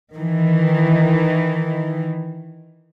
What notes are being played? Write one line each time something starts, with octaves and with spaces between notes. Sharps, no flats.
D#3 E3